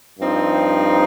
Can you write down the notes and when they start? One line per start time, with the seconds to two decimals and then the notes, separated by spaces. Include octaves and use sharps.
0.18 G2 F3 C4 D#4